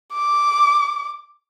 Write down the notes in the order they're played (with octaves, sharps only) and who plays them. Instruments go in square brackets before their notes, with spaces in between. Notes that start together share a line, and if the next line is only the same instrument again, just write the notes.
[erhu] D6